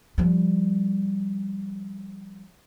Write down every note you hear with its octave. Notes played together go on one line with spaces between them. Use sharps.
F3 G3